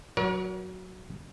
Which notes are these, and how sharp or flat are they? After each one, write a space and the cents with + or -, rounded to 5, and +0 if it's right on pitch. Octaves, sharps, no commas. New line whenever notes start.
F#3 +0 A#4 +40 C#5 +45